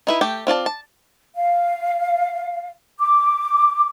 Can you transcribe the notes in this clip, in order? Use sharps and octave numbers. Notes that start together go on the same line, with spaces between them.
D#4 E4 B4
A3 G4 G5
C4 F4 D5 A5
A5
F5
D6